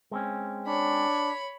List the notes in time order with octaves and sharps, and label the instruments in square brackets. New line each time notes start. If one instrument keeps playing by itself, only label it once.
[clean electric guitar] G#3 C4 C#4
[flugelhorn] D4 [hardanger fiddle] C#5 B5